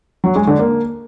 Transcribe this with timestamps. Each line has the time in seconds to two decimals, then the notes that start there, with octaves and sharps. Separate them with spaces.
0.24 F#3
0.35 G#3
0.47 D3
0.59 A#3